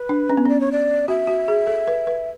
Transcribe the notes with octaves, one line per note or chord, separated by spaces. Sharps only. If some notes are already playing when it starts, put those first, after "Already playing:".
Already playing: B4
D4
C#4
B3
C#4 D5
C#5
D5
F#4 E5
F#4
G#4
A4
B4
B4